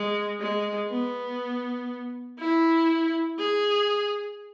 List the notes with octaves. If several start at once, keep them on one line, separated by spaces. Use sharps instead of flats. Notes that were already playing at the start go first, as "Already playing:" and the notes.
Already playing: G#3
G#3
B3
E4
G#4